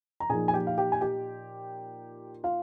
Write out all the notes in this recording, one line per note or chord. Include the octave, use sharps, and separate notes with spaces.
A#5
A#2 F3 A#3 D#4 G#4 G#5
G#5
G4 G5
F5
G4 G5
G#5
G4 G5
F4 F5